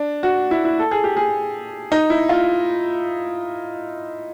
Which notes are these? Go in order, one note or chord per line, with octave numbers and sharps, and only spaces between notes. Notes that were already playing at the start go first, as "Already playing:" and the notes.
Already playing: D4
F#4
E4
E4
A4
G#4
G4
G#4
D#4
E4
F4